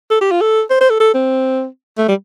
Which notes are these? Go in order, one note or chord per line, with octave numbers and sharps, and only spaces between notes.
A4
G4
F4
A4
C5
C5
A4
A4
C4
A3
G3